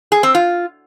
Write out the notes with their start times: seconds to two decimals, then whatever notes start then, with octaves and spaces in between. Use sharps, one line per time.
0.12 G#4
0.23 C4
0.35 F4